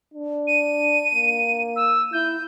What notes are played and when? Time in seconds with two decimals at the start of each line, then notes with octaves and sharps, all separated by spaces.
0.14 D4
0.47 D#7
1.15 A#3
1.76 E6
2.13 E4 G6